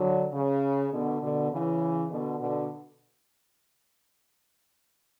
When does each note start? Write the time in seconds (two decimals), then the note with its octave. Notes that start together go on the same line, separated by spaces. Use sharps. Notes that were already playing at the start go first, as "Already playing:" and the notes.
Already playing: D3 F#3
0.33 C#3
0.92 B2 D3
1.21 B2 D3
1.51 C#3 E3
2.10 B2 D3
2.39 B2 D3